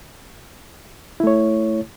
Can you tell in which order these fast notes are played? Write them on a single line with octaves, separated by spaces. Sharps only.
E4 A3 C#5